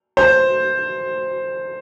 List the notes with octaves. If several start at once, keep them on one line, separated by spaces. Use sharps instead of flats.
C5